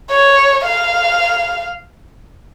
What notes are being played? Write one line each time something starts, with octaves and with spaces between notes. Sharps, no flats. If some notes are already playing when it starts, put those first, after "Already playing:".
C#5
F5